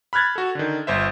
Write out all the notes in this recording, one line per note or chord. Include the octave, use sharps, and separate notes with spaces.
B5 F6 F#6 G#6 A6
F#4 A4
D3 D#3
G1 C5 E5